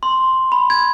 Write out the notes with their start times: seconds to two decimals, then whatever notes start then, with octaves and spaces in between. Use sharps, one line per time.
0.03 C6
0.52 B5
0.70 G#6